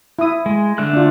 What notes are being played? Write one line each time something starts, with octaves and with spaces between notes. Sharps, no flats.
E4 D#6
G#3
D3 A3 F#6
D4 F4